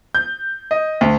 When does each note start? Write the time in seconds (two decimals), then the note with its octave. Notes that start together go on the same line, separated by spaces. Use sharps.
0.15 G6
0.71 D#5
1.01 D2